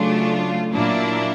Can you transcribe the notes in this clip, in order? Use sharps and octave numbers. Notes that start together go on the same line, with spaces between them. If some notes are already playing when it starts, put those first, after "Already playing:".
Already playing: C#3 F#3 A3 D4 F4
A#2 F#3 A#3 D4 E4